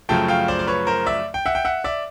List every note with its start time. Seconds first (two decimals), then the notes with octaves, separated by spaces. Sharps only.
0.09 F#2 C#3 F3 A3 G5 A5
0.28 F5 G5
0.48 C5 D5
0.59 D5
0.67 B4 C#5
0.87 A#4 C5
1.06 D5 E5
1.34 G5
1.46 E5 F#5
1.55 G5
1.65 E5 F#5
1.84 D5 E5